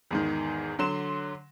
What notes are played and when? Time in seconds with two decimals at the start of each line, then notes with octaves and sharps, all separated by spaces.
0.11 E2 G#2 D#3
0.79 D3 F#3 C6 E7